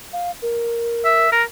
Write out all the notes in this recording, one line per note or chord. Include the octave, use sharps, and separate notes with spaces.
F5
A#4
E5
A#4